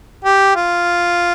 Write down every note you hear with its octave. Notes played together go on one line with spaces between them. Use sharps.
G4
F4